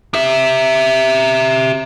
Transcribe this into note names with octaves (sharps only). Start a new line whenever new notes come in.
G4 E5